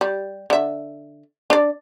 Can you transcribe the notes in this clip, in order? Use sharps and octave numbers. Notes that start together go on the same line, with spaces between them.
G3
D3 E5
D4 D5